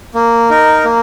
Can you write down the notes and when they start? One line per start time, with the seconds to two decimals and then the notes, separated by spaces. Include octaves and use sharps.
0.15 A#3
0.50 D#4 A#4
0.84 A#3